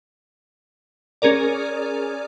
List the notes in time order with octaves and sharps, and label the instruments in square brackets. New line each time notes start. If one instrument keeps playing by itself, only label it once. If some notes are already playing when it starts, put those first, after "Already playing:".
[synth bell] C#4 G#4 A#4 D5